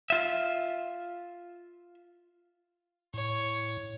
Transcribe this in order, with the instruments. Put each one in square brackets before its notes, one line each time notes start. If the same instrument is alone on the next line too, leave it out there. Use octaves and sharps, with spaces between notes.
[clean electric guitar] F4 E5
[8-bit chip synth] A2 [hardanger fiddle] C#5